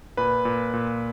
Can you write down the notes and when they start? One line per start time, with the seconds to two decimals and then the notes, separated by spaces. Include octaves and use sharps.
0.17 A#2 B4 B5
0.45 A#2
0.73 A#2